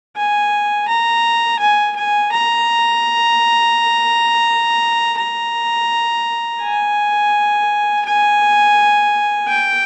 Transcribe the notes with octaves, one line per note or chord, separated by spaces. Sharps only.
G#5
A#5
G#5
G#5
A#5
A#5
G#5
G#5
G5